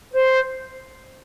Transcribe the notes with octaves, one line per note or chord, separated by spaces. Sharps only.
C5